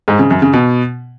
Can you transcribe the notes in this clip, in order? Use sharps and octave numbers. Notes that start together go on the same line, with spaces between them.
G#2
C#3
F#2
C#3
B2